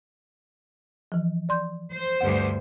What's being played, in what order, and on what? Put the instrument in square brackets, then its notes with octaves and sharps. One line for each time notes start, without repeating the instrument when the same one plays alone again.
[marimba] E3 F3
D5 C6 G6
[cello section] C5
[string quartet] D2 G2 [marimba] F#5